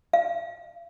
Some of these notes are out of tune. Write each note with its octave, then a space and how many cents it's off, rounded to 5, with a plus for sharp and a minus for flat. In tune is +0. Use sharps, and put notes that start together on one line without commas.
F5 -45